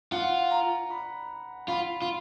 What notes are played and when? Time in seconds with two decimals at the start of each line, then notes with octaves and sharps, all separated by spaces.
0.12 F4 F#5
0.51 A#5
0.90 B5
1.68 F4 B5
2.02 F4